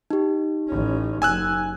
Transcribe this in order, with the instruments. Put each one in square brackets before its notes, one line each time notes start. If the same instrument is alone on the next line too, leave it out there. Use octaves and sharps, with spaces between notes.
[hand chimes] D#4 G4
[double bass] A1 C#4
[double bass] F#1 [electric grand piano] G#5 E6 F#6